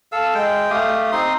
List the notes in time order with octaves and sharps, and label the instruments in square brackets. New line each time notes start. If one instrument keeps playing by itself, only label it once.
[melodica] A4 F5 E6
G#3 G5
A3 G4 F5 D#6
C4 D#4 C6 D#6